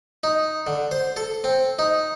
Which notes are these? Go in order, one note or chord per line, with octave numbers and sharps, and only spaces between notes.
D#4
D3
C5
A4
C4
D#4